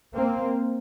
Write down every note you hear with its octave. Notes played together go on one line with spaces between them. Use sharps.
A#3 C4